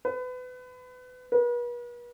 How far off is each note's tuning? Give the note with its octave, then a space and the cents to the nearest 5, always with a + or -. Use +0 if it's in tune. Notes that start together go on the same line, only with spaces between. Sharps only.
B4 +30
B4 -40